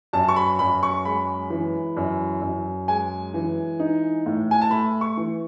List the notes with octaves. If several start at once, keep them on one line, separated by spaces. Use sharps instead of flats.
F#2 A5
C#6
B5
F#2 B5
C#6
G#3 B5
E3
F#2
F#2
G#3 G#5
E3
D#4
A2
G#5
A5
A3 B5
C#6
E3